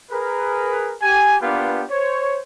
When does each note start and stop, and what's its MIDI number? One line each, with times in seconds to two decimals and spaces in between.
0.11 0.96 68
0.11 0.96 70
0.11 0.96 71
1.02 1.36 67
1.02 1.36 80
1.41 1.84 58
1.41 1.84 59
1.41 1.84 62
1.41 1.84 65
1.41 1.84 67
1.41 1.84 71
1.91 2.40 72
1.91 2.40 73